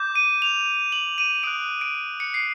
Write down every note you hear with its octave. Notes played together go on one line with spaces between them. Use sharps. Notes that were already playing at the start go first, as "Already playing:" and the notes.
Already playing: D6 G6
D#7
F7
F#7
D#7
D#6 F#6 D7
D7
C#7
C7